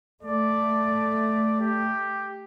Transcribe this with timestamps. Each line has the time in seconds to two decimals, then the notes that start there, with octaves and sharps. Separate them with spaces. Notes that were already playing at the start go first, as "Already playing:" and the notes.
0.23 A3 D5
1.60 G4